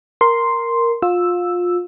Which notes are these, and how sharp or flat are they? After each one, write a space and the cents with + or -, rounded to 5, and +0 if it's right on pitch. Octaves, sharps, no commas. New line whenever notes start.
A#4 +0 C6 +0
F4 +25 E6 +0